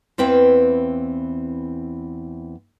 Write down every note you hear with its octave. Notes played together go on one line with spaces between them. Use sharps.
E2 E3 C4 B4 F5 G5